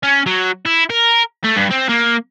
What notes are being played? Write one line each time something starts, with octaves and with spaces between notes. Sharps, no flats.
C#4
F#3
E4
A#4
A3
G2
C4
A#3